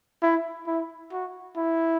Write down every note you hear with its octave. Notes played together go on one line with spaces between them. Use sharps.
E4
E4
F#4
E4